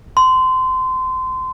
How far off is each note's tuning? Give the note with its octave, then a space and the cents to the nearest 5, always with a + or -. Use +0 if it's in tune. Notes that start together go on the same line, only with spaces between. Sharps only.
C6 -25